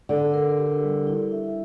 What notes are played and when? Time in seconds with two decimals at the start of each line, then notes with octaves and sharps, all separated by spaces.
0.09 D3 D4
0.34 A#4
0.58 G4
0.83 G3
1.07 E4
1.32 E5